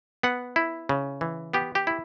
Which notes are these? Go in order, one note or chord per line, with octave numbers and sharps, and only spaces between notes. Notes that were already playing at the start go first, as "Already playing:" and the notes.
B3 F#5
E4
C#3
E3
B3 G4
G4
E4